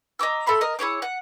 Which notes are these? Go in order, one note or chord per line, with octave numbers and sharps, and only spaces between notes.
D#5 A#5 D6 E6
A4 E5 B5 C6
A#4 D#5
E4 G#4 C#5 D6
F#5